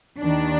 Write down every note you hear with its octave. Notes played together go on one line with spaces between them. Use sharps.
D#2 D#3 D4